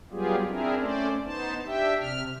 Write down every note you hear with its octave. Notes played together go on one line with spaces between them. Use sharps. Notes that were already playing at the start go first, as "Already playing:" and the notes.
F#3 G3 B3 F4 G4 G#4
C4 D4 E4 G#4 A#4
A3 C#4 C5 D5
B3 D#4 C5 A5
D4 G4 E5 G5
C3 F6